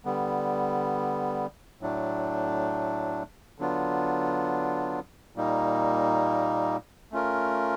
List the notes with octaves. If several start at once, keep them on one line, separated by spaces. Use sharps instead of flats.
D3 G3 B3
A2 F#3 A3 D4
D3 F#3 B3 D4 F4
A#2 G3 A#3 D#4
A3 C#4 F4 A#4